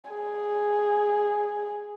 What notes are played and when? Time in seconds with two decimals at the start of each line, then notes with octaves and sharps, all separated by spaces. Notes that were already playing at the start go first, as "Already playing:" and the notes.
0.10 G#4